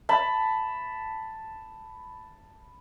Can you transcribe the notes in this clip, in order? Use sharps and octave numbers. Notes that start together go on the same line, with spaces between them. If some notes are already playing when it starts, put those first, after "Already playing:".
A5 B5